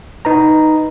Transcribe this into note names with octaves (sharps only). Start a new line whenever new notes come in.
D#4 B4 A#5